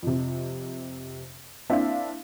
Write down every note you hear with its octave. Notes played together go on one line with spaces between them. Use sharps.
F2 C3
A#3 C4 D4 E4 E5 F5